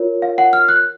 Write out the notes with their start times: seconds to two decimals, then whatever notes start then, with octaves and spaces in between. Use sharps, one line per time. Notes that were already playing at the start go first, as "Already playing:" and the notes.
Already playing: F4 A#4 C#5
0.22 F5
0.38 F#5
0.53 F6
0.69 F#6